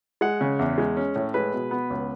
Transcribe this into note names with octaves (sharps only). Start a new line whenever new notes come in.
G#3 F#5
C#3
E2
G#3
C#4
A2
G#3 B4
B2
B3
C#2